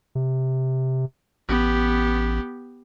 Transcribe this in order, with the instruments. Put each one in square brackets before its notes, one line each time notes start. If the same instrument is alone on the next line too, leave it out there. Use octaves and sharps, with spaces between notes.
[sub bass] C3
[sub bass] A1 [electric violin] B3 G4